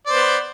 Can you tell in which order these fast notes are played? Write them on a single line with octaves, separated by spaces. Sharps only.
D5 C5 B3